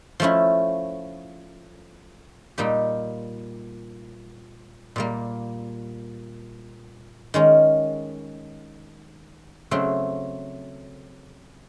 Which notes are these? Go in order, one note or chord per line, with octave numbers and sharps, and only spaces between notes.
F3 A3 C#4 E4
A#2 G3 A#3 D#4 G4
A#2 G3 A#3
D#3 G#3 C#4
C#3 F#3 A3 C4